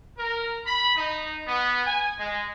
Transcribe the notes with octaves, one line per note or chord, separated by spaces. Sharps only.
A#4
B5
D#4
B3
G#5
G#3